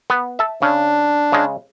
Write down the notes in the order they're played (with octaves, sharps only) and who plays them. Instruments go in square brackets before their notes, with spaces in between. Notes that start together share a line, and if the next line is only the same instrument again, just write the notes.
[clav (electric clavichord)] B3
E5 A5
[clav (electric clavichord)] C#3 [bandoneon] D4
[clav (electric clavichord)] C#3 G#3